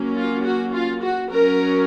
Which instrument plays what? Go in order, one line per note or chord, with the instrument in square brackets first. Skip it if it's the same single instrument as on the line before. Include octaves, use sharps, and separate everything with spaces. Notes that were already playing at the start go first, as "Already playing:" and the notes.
Already playing: [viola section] F#3 A#3 C#4
F4
F#4
F4
F#4
F#3 C#4 A#4